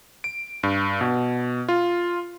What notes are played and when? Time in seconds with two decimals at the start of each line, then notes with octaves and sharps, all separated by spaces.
0.24 D7
0.63 G2
1.01 B2
1.69 F4